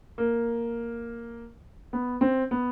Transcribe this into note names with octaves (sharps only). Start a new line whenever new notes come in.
A#3
B3
C4
B3